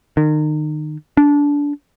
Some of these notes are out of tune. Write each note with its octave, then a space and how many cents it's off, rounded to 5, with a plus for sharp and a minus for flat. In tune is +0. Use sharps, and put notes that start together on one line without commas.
D#3 -30
D4 -20